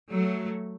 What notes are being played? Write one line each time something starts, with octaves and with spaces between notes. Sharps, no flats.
F#3 A3